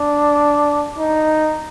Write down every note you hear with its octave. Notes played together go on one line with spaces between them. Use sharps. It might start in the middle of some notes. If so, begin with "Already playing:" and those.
Already playing: D4
D#4